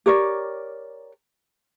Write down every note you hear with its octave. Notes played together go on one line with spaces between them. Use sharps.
G4 A#4 C#5 D5